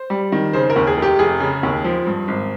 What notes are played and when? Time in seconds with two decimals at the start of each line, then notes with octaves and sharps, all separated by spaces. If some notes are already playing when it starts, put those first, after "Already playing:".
Already playing: C5
0.10 G3
0.32 D#3
0.53 C#3 C5
0.70 A#4
0.76 D#2
0.87 G#4
0.97 F1
1.02 G4
1.19 F1 G#4
1.40 C#3
1.63 D#2
1.84 F3
2.07 G2
2.28 G#1